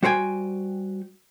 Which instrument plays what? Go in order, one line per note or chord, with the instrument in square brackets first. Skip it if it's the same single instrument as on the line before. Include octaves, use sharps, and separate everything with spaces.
[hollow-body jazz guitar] G3 F#4 C5 G5 G#5